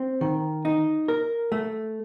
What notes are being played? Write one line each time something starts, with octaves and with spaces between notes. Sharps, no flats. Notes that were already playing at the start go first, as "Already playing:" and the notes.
Already playing: C4
D#3
D#4
A#4
A3